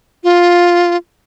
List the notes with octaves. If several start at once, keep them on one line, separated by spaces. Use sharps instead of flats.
F4